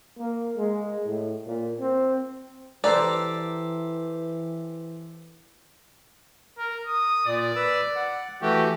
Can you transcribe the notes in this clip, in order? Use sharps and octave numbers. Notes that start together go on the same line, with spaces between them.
A#3
G#3
A2
A#2
C4
E3 G4 A4 B4 C5 D5 A#5
A#4
D#6
A#2 D5
B4 E6
F#5
E3 A3 F#4 G4